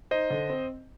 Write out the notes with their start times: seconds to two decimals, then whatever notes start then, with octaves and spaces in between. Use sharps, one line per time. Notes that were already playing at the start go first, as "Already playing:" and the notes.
0.11 D#4 C5 D#5
0.30 D3
0.50 C4